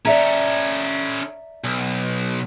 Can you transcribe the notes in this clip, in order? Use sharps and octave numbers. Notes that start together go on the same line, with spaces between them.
C#4 A4 D5 E5 A#5
B1